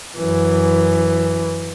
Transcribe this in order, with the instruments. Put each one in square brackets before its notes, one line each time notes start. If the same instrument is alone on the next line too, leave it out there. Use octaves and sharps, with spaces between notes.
[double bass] F#2 E3